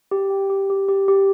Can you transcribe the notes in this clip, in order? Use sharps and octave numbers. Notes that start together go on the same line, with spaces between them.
G4
G5
G4
G4
G4
G4